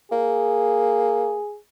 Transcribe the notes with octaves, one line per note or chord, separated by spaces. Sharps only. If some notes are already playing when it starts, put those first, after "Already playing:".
A#3 G#4